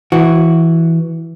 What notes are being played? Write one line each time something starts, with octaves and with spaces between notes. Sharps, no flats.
E3 F#4